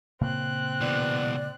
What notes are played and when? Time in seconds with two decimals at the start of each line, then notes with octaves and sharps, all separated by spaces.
0.21 A#2 C#3 A#3 C4 F#6
0.81 B2 E3 D5